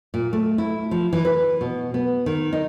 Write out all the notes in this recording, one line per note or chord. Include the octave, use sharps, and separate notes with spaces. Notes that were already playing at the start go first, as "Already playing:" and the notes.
A#2
A3
E4
F3
E3
B4
B2
B3
D#3
D#4